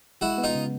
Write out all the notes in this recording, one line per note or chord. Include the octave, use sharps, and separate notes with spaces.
G#3 E4 F#4
B3
D#4 F4
C#3